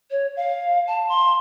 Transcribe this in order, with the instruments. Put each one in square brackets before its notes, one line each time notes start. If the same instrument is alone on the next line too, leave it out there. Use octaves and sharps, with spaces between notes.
[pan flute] C#5
F5
A5
C6